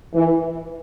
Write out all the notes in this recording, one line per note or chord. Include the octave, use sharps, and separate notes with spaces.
E3